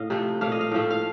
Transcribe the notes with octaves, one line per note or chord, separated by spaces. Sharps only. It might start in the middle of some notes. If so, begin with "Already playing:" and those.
Already playing: A2 D#5 F5
C3 F3 A3
A#2 A3 F5
D#5
F5
A2 F3 A3
F5